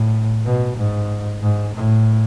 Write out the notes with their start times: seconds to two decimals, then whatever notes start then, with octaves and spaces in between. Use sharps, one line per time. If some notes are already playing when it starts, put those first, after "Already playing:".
Already playing: A2
0.45 B2
0.77 G#2
1.42 G#2
1.75 A2